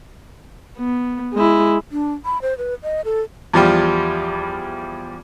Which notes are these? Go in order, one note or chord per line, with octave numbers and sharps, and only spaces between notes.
B3
G#3 E4
D4
B5
C5
B4
D#5
A4
E2 F3 G3 F4